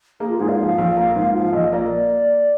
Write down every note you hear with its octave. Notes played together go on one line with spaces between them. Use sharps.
A#3 G#4
F4
G#2 G#4
F5
F3
A#1
A#3
G#2
F3 F5
A#1 D#5
A#3 D5